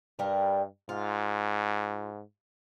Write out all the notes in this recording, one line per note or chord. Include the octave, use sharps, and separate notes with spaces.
G2 G3 A#4
G#2 F4